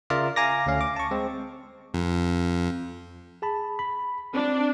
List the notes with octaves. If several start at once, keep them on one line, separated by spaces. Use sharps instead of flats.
C#3 F4 A#4 D5 E5 A#5
F5 G#5 A#5 D6 A#6
D2 A3 C#4 F5
D6
A5 C#6
G#3 C4
F2
G#4 A5 B5
B5
C4 D4